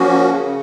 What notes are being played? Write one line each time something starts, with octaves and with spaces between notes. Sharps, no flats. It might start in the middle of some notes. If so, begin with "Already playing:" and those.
Already playing: F3 A#3 C#4 F#4
C#3